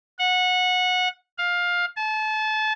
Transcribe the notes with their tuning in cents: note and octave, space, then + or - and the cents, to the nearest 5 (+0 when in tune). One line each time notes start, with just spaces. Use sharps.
F#5 -20
F5 +15
A5 -30